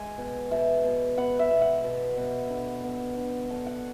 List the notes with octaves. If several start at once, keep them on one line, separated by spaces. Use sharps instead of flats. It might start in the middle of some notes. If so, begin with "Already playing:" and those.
Already playing: G#3 G#5
B2
B2 E5
B2
B3 F#5
E5
B2
F#5
B2
B2
D3
B3
D3
D3 A5
F#5